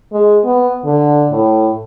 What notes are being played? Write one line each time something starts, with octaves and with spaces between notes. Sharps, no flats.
G#3
B3
D3
A2